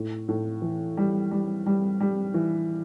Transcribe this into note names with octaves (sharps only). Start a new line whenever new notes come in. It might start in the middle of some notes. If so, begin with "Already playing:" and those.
Already playing: A2
A2
E3
G3
G3
G3
G3
E3